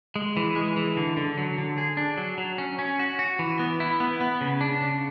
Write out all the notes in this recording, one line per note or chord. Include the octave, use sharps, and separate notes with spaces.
G#3
E3
G#3
E3
D3
D3
F#3
D3
G#4
D4
F#3
F#3
C#4
C#4
F#4
F#4
E3
B3
E4
B3
B3
C#3
D4
C#3